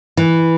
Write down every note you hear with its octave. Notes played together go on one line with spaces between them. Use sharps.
E3